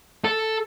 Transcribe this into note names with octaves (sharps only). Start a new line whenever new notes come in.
A4